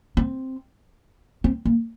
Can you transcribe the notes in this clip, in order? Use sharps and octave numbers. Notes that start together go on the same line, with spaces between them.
C4
C4
A#3